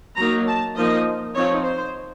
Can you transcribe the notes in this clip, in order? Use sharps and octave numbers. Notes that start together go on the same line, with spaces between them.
F#3 A#3 D#4 A#5
A5
F3 A#3 D#4 D#5
F3 C4 D#4 C#5
C5